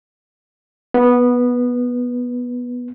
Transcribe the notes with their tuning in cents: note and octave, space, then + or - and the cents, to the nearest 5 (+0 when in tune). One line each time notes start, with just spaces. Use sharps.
B3 -10